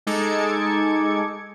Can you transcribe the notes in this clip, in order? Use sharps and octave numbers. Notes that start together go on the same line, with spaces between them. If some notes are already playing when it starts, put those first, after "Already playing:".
G#3 D#4 A4 D6 G#6 C#7